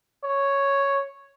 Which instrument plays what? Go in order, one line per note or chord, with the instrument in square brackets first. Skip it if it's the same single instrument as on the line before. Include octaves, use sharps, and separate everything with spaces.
[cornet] C#5